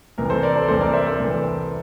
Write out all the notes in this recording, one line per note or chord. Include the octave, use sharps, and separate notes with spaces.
C2 C3 E3 A#4
A4 C5
A#4 D5
A4 C5
C2 C3 E3 A4 C5
A#4 D5
C5 E5
A4 C5
C2 C3 E3